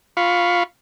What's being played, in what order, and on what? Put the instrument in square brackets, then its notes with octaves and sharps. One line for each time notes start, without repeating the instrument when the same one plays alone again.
[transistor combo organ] F4 F5 B5 C#6